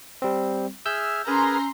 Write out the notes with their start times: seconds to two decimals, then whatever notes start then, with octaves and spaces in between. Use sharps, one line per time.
0.22 G3 C4
0.86 G#4 E5 E6 F6 G6
1.27 C#4 G#4 A#4 B4 A#5 C6